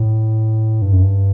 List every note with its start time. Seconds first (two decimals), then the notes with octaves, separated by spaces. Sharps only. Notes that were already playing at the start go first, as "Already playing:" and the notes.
Already playing: A2
0.82 G2
0.92 F#2
1.02 G2